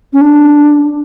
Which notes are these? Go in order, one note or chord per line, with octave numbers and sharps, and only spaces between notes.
C#4
D4